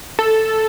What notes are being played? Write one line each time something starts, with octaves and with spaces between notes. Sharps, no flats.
A4